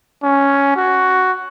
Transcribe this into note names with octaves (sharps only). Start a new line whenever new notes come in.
C#4
F#4